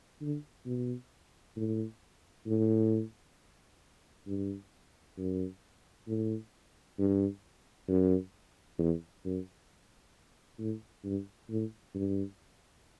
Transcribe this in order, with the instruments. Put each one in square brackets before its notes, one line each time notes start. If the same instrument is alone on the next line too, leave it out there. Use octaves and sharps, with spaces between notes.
[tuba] D3
B2
A2
A2
G2
F#2
A2
G2
F#2
E2
F#2
A2
G2
A2
G2